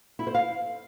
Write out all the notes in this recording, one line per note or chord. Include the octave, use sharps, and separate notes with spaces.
E4
C5
F5